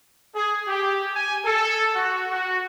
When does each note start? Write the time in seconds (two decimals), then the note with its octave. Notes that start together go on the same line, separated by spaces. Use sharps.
0.35 G#4
0.68 G4
1.14 G#5
1.44 A4
1.94 F#4
2.30 F#4